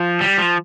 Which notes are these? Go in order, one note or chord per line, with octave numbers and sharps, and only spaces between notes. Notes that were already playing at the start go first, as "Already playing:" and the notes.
Already playing: F3
G3
F3